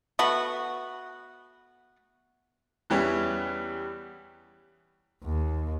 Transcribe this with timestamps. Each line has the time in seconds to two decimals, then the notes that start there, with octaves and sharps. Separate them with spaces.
0.19 A3 B3 F#4
2.90 E2 E3 G3 C#4
5.24 D#2